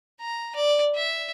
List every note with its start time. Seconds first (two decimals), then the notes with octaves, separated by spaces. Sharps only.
0.20 A#5
0.55 D5
0.95 E5